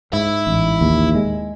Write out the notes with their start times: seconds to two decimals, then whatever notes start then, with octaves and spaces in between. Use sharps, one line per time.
0.13 G#2 E4
0.47 A1
0.81 D#2
1.15 G#3